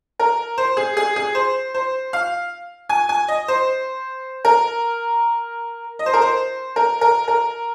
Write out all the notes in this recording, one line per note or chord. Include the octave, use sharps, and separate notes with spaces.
A#4
C5
G#4
G#4
G#4
C5
C5
F5
G#5
G#5
D#5
C5
A#4
D#5
C5
A#4
C5
A#4
A#4
A#4